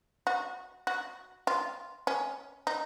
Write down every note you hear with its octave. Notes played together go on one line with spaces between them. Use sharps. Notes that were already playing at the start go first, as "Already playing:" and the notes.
F#4
F#4
F4
C#4
D#4